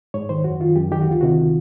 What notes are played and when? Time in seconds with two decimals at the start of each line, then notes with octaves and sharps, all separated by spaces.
0.14 G#2 C#5
0.29 D#3 C5
0.44 F#2 F#4
0.60 D#3 F4
0.76 F#2 G4
0.91 D#3 G4
1.01 F#4
1.07 D2 F4
1.21 C3 D#3 F#4